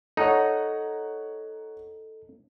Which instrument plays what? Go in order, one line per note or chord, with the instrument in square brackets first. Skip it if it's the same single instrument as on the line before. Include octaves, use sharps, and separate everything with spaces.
[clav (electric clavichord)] D#4 [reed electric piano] A4 [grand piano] C#5 F#5 A#5